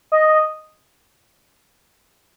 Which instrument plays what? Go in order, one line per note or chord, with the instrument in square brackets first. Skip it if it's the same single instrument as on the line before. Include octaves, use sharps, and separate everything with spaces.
[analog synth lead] D#5